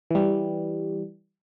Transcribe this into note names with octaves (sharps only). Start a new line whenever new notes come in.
E3 G3